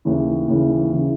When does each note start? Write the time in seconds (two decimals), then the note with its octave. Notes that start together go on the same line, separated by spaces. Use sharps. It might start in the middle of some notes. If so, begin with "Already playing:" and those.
0.05 D#2 C#3 E3
0.48 D#2 C#3 E3
0.92 C#3 E3